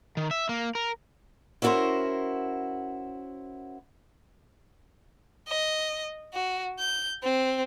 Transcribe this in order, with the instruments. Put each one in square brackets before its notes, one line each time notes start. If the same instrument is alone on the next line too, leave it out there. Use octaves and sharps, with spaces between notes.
[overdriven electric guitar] D#3
E5
A#3
A#4
[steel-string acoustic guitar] C#4 E4 F#4 A4 A#4 C5
[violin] D#5
F#4
G6
C4